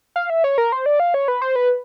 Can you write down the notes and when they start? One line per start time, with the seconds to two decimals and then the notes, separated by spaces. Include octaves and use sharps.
0.16 F5
0.30 E5
0.44 C#5
0.58 A#4
0.72 C5
0.86 D5
1.00 F5
1.14 C#5
1.28 B4
1.42 C5
1.56 B4